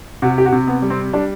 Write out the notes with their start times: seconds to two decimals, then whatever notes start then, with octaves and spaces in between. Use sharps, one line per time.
0.22 C3 F#4
0.38 G4
0.46 F#4
0.53 C3
0.67 B3
0.82 G3
0.90 C4
1.13 G3 D4